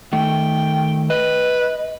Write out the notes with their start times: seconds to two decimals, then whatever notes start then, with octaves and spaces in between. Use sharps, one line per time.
0.13 D#3 A3 G5
1.10 B4 D#5